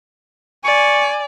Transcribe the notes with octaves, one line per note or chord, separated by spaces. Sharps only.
D5 G#5 C#6